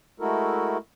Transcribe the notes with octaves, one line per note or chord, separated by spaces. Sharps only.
G#3 A3 E4 F#4 A4 A#4